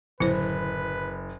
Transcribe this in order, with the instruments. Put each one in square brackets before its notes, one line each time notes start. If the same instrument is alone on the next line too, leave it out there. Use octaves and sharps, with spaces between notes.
[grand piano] F#1 [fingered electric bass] A2 D3 F#3 [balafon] E4 C5 [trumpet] B4